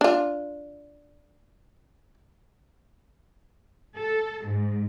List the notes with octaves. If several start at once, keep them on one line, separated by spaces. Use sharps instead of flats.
D4 F4
A4
G#2